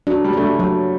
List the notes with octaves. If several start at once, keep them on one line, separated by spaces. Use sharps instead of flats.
F#3 D4
G3
A3 D4
G3
F#3 A3